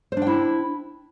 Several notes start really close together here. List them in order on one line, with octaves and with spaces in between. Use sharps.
C5 D4 G5 E4